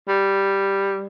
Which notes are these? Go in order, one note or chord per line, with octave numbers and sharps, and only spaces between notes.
G3